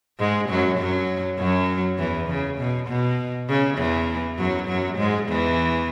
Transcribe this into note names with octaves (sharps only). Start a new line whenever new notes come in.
G#2 G#3
F#2 F#3
F#2 F#3
F#2 F#3
E2 E3
C#3
B2
B2
C#3
E2 E3
F#2 F#3
F#2 F#3
G#2 G#3
E2 E3